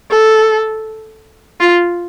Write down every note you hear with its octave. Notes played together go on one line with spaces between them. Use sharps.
A4
F4